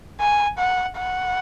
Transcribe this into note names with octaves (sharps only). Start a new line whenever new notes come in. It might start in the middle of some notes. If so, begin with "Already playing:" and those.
G#5
F#5
F#5